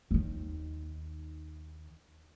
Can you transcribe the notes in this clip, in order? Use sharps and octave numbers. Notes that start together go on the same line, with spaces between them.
D#2 D#3